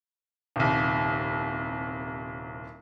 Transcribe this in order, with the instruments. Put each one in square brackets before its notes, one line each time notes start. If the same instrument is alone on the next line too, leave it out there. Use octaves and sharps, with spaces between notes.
[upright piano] D#1 C2